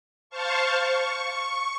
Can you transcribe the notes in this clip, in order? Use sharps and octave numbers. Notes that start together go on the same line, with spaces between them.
C5 F5 A5 C#6
C#6